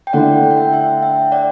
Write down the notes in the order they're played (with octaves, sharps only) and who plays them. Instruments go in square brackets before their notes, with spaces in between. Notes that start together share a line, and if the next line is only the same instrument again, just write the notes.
[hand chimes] G5
[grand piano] D3 A3 E4 [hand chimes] D5 F#5
[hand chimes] G5
F#5
E5 G5
E5 G5
E5 G5
D5 F#5